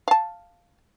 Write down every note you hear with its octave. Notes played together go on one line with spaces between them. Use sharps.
F5 A5